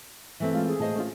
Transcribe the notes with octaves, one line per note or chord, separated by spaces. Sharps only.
E3 A3 C4 E5
G#3 F4 F5
G#4
A2 A3 C5 D#5 A5
A3 C#4 F4